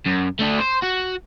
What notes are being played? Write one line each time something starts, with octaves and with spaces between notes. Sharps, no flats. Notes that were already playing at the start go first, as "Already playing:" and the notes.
F#2
A3 D4
C5
F#4